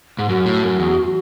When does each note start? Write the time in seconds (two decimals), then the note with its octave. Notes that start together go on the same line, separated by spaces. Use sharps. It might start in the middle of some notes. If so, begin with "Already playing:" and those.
0.19 G#2
0.29 F#2 F#4
0.46 A2
0.63 F#2
0.80 E2